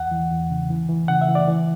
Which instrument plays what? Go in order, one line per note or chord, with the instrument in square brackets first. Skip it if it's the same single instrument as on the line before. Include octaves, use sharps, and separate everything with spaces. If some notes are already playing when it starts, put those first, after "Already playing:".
Already playing: [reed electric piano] E2 F#5
E3
E2
C#3
E3
E3
C#3 F#5
E5
E3
D5
E3